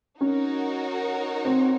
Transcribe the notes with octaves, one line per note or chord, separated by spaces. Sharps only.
C#4 D#4 F#4 A#4 C#5
C4